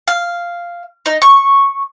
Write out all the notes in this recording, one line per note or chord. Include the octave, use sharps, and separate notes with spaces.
F5
D#4
C#6